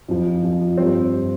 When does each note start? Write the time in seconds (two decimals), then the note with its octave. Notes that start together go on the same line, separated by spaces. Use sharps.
0.08 F2 F3
0.43 F2 F3
0.77 G2 G3 C4
1.14 G3